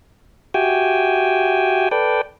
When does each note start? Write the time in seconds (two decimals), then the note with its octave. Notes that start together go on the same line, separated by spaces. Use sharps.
0.54 F#4 G4 E5 G5 G#5
1.91 A4 B4 D5 G5